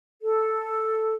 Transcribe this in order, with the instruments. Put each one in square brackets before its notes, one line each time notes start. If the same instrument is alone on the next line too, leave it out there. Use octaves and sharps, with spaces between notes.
[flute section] A4